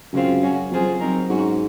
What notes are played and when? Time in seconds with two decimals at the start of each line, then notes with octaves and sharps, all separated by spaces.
0.13 F#2 C#3 G#3 C4 F4
0.42 F#3 C#4 F#4
0.71 F2 F#3 C4 F4 G#4 C5
1.00 F#3 C4 D#4 A#4
1.29 G#2 F#3 C#4 F#4